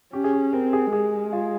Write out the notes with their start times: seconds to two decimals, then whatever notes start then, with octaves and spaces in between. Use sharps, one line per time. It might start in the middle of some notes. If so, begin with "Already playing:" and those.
0.13 C#4 G4
0.24 G#4
0.33 G4
0.53 C4 A#4
0.73 G#4
0.92 G#3 G#4
1.33 F4